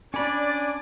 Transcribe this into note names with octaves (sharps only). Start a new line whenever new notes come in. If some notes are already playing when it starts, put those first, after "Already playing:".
C#4 D4 D5 G#5 B5